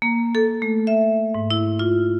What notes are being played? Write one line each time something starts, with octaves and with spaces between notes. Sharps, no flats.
A#3
A4
A3
E5
G#2
E4
F4